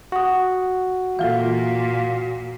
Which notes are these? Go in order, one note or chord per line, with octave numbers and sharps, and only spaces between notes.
F#4 F#5 D#6
A#2 E3 A#3 F4 A4 F5